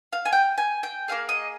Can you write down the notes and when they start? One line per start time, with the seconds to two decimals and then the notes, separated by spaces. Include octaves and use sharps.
0.13 F5
0.25 G#5
0.32 G5
0.58 G#5
0.83 G5
1.08 A#3 F4 G#4 F5
1.29 D#5